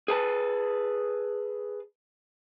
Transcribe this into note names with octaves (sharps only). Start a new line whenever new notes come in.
G#4 B4 A5